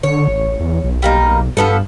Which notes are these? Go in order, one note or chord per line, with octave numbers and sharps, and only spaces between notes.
D3 C#5
A1
E2
B1
G3 A#3 D#4
G2 F3 B3 A4